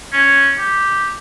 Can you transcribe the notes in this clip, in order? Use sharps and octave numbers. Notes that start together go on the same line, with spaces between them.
C#4
G4